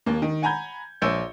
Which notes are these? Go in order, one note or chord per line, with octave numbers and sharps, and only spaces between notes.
D#2 A#3
D#3
F#5 G#5 A#5 B5 G6 G#6
A#1 C#5 E6 G6 C#7